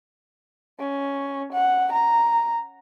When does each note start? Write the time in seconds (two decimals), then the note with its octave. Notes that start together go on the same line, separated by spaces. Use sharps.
0.79 C#4
1.52 F#5
1.92 A#5